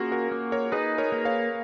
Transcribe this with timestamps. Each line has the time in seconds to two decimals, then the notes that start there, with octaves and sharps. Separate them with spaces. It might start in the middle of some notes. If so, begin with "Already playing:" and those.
Already playing: A#3 C#4 F4 F#4 G#4 A#4
0.12 F#4 A#4
0.31 A#3
0.52 A#4 C#5
0.72 D#4 G#4 B4
0.98 A#4 C#5
1.12 A#3
1.25 C#5 F5